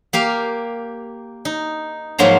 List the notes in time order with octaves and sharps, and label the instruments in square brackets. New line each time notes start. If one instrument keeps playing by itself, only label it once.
[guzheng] A#3 G4 F5
D#4
G#2 F3 F#3 A#3 C5 A#5